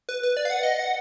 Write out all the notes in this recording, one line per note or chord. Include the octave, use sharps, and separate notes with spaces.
B4
B4
D5
F5
F#5
D#5
F#5